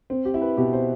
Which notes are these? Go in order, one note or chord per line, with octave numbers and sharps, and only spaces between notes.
C4
G4
E4
B4
B2 G4
C5